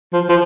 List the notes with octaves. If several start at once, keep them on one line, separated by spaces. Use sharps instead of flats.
F3
F3